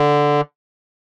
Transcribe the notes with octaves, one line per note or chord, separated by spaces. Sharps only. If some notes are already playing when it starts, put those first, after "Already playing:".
Already playing: D3